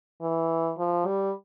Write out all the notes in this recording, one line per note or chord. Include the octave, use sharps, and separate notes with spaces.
E3
F3
G3